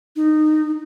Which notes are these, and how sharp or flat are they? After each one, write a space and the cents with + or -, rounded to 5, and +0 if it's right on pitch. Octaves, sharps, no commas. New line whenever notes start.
D#4 -20